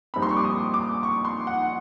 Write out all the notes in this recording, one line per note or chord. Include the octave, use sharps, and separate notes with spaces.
A#1 A#2 G3 C4 D#4 B5
C6
C#6
D6
D#6
D6
C#6
C6
F#5